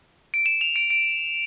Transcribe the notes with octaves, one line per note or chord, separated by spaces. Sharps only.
D7
E7
F7
D7
D7